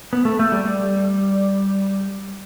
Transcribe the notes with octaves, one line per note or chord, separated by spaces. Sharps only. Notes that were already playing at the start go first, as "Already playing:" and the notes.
B3
A3
A3
G3
G3